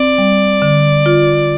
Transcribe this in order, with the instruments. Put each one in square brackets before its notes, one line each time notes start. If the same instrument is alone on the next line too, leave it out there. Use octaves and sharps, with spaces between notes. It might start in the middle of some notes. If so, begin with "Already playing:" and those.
Already playing: [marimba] C4 [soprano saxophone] D5
[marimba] G3
D3
F4